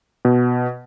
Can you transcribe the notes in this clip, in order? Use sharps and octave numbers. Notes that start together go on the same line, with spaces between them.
B2